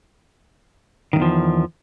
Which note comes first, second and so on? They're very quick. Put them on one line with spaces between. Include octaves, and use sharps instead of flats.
D#3 G2 E2 F3